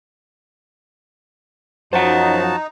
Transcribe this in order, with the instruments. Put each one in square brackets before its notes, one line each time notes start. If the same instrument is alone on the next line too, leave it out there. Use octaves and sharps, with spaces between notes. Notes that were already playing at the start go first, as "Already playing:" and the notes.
[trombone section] F#2 F3 F#3 [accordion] D#4 [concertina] F#4 A5 [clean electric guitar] C5 F#5